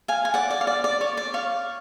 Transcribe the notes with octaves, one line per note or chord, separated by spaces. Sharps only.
F5 G#5
G#5
D5 F#5
D5
F5
D5
D5
C#5
D5
C#5 F5